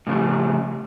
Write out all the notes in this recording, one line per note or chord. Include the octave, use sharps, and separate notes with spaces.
A2 C#3 F3 G3 A3